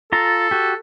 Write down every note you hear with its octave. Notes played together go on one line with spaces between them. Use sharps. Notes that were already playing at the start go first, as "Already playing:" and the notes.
F4 A4 A#5
F#4 G4